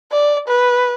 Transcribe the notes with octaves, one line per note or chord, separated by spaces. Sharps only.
D5
B4